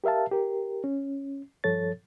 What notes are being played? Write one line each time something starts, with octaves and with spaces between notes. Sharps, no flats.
G4 A#4 E5 F5 A5
G4 A#4
C#4
G2 F3 A4 C#5 A6